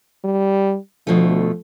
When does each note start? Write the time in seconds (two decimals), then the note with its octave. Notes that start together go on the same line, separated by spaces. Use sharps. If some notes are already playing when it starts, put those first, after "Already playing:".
0.24 G3
1.07 D2 B2 F3 A3